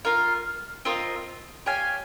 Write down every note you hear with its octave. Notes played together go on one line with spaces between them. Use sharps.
F4 A#4 F5
C4 F4 A#4 D#5
G4 C#5 F5 G#5